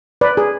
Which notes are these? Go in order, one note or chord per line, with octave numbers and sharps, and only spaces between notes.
B4 D5
G#4